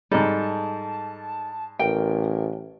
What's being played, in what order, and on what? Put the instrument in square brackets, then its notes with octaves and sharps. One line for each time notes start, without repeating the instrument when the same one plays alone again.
[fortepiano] G#2 G3 [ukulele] D#4 A4 [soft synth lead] A5
[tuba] A1 [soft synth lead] A#4 [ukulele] G5